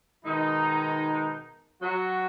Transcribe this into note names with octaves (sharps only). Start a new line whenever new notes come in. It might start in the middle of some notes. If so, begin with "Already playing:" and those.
B2 D#3 G#3 D#4
F#3 F#4